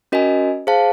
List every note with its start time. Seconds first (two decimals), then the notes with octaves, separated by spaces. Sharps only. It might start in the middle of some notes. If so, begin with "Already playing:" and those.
0.12 C#4 F#4 A#4 D#5 G#5
0.67 G#4 C5 F5 A5